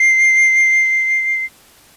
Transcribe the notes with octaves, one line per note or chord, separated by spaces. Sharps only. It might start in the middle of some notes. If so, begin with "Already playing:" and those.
Already playing: C7